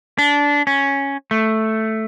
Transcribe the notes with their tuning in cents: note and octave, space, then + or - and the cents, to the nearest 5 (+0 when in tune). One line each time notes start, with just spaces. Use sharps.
D4 -20
C#4 +0
A3 +0